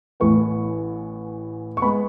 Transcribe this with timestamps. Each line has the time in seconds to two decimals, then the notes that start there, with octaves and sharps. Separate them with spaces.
0.20 A1 A2 E3 B3 C#6
1.77 C#6
1.82 G#3 B3 B5